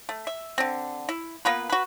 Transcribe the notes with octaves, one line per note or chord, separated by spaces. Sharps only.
A3
E5
D3 C4
E4
A#3 B3 F4 B4
F#4 B4